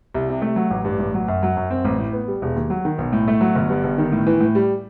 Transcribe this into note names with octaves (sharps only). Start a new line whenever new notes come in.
C2
C3
A3
F#3
A1
G2
A1
F#3
F#2
F#3
F#2
C4
A1
A2
B3
G3
E1
D#2
F#3
D#3
B1
A2
A3
F#3
G1
G2
G1
D#3
A2
E3
A2
G3